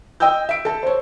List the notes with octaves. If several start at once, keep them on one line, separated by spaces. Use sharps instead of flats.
D#5 G5 D#6 E6 G6
E5 D7
A4 A5
C5 C#5